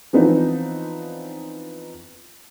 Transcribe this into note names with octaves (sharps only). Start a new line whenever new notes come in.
E3 F3 B3 C4 D4 D#4